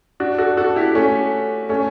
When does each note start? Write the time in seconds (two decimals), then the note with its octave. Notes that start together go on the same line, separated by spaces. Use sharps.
0.20 D4 F#4
0.38 F#4 A4
0.57 F#4 A4
0.75 E4 G4
0.95 A3 C#4
1.69 A3 C#4